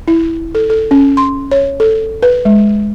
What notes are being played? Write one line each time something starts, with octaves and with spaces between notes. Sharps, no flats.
E4
A4
A4
C#4
C6
C#5
A4
B4
G#3